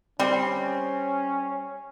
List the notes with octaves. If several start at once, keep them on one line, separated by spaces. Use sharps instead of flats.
G3 C4 C#4